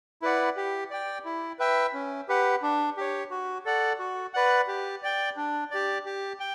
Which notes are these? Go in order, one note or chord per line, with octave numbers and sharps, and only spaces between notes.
E4 B4 D5 F#5
G4
D5 G5
E4
B4 E5 G5
C#4
G4 B4 F#5
D4
G4 C#5
F#4
A4 D5 F#5
F#4
B4 D5 F#5
G4
D5 G5
D4
G4 D5
G4
G5